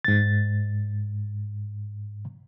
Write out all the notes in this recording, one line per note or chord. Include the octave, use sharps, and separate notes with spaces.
G#2 A6